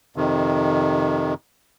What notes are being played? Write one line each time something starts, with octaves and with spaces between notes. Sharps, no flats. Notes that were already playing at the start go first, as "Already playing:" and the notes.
F2 C3 D#3